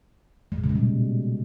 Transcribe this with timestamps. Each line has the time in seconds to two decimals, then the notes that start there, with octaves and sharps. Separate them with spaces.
0.52 G#3
0.58 A#2
0.64 C#3
0.69 B2
0.75 G3